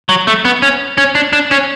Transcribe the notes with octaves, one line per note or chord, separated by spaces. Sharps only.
F#3
A3
B3
C#4
C#4
D4
D4
C#4